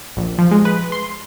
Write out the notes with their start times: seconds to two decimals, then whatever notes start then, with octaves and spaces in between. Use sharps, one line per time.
0.17 A#1
0.39 F3
0.51 G#3
0.65 B4
0.92 C6